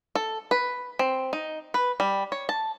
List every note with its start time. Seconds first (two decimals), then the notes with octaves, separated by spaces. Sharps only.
0.15 A4
0.51 B4
0.99 C4
1.33 D#4
1.74 B4
2.00 G3
2.32 C#5
2.49 A5